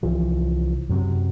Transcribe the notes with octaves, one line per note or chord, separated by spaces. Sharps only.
C2 E3 F3
F#2 C3 F#3